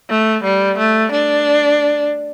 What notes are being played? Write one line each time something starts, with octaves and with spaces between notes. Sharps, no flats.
A3
G3
A3
D4